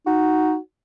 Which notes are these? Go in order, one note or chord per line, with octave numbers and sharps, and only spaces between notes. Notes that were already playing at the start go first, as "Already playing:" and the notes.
D#4 F#4